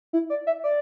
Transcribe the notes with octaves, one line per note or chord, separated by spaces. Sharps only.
E4
D5
E5
D5